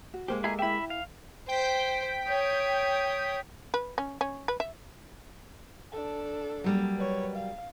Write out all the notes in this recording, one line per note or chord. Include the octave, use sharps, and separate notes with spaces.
F#4
G#3 A#3 G4 C5
E4 G#4 A4 D#5 A#5
E4 E5 G5 B5
F5
C5 G5 B6
C#5 D#6
B4
C#4
C#4
B4
E5
D4 A4
F#3 G3 A#3
B4 C#5
F5